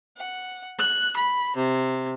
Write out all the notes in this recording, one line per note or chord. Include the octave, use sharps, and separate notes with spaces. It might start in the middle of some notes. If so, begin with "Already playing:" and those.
F#5
F#6
B5
C3